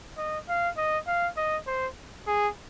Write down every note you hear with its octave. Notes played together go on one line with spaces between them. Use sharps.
D#5
F5
D#5
F5
D#5
C5
G#4